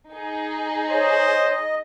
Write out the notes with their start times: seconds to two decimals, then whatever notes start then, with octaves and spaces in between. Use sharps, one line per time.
0.11 D#4 G#4
0.90 C5 C#5 D#5